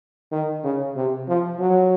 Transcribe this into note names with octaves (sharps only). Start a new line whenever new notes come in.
D#3
C#3
C3
F3
F#3